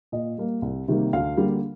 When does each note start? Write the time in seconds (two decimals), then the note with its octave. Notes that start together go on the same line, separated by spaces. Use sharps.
0.12 A#2 D#5
0.38 G3 A#3
0.62 C2
0.88 C3 D#3 G3 A#3
1.13 D2 F5
1.37 D3 G3 A#3